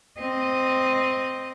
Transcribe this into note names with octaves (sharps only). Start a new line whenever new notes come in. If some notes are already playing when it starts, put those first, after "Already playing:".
C4 D#5